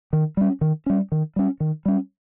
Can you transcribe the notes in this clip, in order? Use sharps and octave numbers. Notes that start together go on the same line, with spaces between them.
D#3
G3 C#4
D#3
G3 C#4
D#3
G3 C#4
D#3
G3 C#4